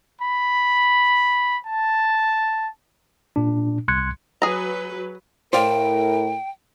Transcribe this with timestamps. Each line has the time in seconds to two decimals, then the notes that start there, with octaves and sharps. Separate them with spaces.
0.22 B5
1.66 A5
3.36 A#2 D4
3.88 C2 C6 F#6 G#6 C#7
4.42 F#3 G#4 B4 A#5
5.53 A2 A#4 C5 D5 F5 G5